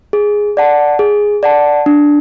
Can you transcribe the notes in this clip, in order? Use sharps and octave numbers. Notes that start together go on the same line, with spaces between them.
G#4
D5 F#5 A5
G#4
D5 F#5 A5
D4